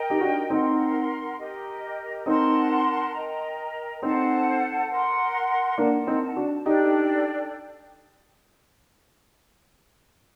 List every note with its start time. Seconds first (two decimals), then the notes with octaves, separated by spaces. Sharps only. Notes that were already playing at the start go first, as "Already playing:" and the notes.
Already playing: A#4 D#5 G5
0.10 D#4 G4
0.21 D4 F#4
0.50 C4 D#4 A#4 F#5 C6
1.38 G4 A#4 D#5
2.26 C4 D#4 A#4 F#5 A5 C6
3.14 A#4 D#5 G5 A#5
4.02 C4 D#4 A4 C5 F#5 A5
4.90 A#4 F#5 C6
5.78 A#3 D4 A#4 F#5 A5
6.07 C4 D#4
6.36 D4 F#4
6.66 D4 D#4 G4 A4 D5 G5